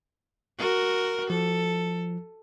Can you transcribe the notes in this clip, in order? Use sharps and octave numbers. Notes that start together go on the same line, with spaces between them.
F#4 A#4
F3 A4